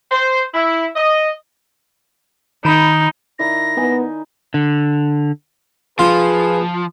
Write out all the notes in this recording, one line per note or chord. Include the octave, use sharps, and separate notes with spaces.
C5
E4
D#5
D#3 D#4 B5
D#3 E4 D5 A#6
B3 D#4 G#5
D3
F3 F4 G#4 B4